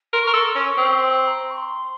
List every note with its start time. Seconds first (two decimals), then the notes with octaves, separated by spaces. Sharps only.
0.13 A#4 C6
0.23 A#4 C#6
0.33 A4 C6
0.55 C#4 C#6
0.77 C4
0.99 C6
1.27 A#5
1.51 C#6
1.57 C6